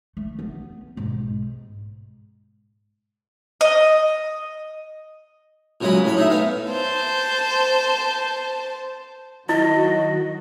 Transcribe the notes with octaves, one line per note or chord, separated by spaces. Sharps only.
A3
B3
B1 G#2
D#5
A#2 C#3 F#3 G#3 G#4 B5
A2 C#5 B5
D#4 G#4 E5
B3 F5
C5 A5
D#3 F#3 E4 F#4 D#5